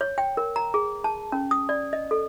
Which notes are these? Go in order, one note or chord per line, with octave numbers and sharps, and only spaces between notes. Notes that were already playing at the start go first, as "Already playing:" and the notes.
C#5
G5
A#4
A#5
G#4
A5
C#4
D#6
D5
D#5
A4